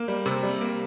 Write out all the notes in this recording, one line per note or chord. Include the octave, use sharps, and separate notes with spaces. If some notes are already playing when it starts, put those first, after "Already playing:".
Already playing: A#3
G3
C3
G3
A#3